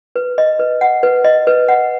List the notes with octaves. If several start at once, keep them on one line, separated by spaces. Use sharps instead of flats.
B4
D#5
B4
F#5
B4
D#5
B4
F#5